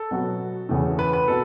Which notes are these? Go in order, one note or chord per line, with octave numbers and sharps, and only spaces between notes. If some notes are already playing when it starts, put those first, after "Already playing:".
Already playing: A4
B2 F#3 B3 F#4
E2 C#3 E3 A3
B4
B4
B2 A4